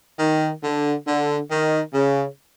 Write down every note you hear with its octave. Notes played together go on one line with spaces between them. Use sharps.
D#3
D3
D3
D#3
C#3